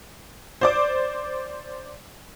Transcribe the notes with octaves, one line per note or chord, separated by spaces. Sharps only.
C5 D5 D6